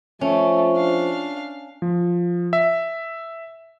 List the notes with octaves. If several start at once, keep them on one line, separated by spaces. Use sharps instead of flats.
F3 A3 C#4
D4 F5
F3
E5